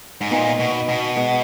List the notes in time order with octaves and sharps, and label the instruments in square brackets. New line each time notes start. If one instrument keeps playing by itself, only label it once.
[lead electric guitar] G#2
[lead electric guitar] A#2 [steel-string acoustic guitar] B3 D#4
[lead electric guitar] B2
B2
[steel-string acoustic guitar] G#3 B3